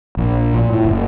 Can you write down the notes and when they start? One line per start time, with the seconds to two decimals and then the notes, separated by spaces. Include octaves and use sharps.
0.17 A#1
0.53 A#2
0.72 A2
0.85 F#1